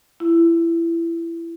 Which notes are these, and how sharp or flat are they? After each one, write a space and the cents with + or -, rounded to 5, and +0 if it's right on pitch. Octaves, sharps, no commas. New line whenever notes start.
E4 +20